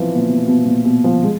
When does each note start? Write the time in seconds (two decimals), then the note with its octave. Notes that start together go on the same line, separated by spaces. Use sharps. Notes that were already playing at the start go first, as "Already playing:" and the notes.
Already playing: E3 F3
0.16 A#2
0.29 B2
0.47 B2
0.65 A#2
0.85 B2
1.04 F3
1.23 G#3